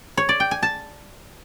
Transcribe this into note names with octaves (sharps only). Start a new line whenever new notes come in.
C#5
D5
G5
G#5
A5